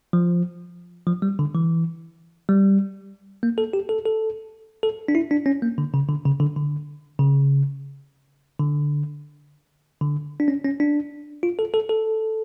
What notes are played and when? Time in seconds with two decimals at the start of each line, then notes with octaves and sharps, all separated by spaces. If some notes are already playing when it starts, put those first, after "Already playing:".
0.13 F3
1.07 F3
1.22 G3
1.39 D3
1.55 E3
2.49 G3
3.43 A#3
3.58 A4
3.73 G4
3.89 A4
4.05 A4
4.83 A4
5.08 D4
5.15 E4
5.31 D4
5.46 C#4
5.62 A#3
5.78 D3
5.94 C#3
6.09 D3
6.25 C#3
6.40 D3
6.56 D3
7.19 C#3
8.60 D3
10.01 D3
10.40 D4
10.48 C#4
10.65 C#4
10.80 D4
11.43 F4
11.59 A4
11.74 A4
11.89 A4